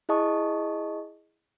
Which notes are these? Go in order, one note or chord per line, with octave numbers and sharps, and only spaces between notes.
E4 G#4 D#5 A5 C#6 D#6